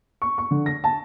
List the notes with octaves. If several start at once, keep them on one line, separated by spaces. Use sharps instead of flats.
C#6
C#6
D3
A#6
A5